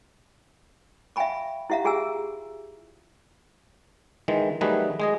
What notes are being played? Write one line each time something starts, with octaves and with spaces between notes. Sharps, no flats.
E5 F5 G5 G#5 B5 C#6
E4 G4 E5 F5 A#5
F4 G4 G#4 G#5 A#5 E6
D#3 E3 G#3
D#3 F#3 G3 A3 G#4 B4
G#3 G#4 D#5